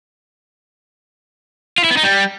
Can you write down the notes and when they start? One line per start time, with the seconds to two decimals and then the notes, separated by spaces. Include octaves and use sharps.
1.78 F4
1.84 E4
1.91 B3
1.97 D#4
2.03 G3